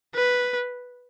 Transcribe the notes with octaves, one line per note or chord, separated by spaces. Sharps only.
B4